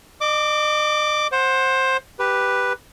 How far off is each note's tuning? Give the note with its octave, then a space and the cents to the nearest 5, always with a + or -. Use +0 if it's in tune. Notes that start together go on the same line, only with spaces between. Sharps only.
D#5 -40 D6 +0
C5 +15 F#5 +0
G4 +0 B4 +0